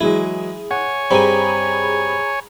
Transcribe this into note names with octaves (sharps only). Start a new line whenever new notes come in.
E3 F#3 G#3 E4 G#4
C#5 F#5 G#5
G2 C4 G#4 A#5 B5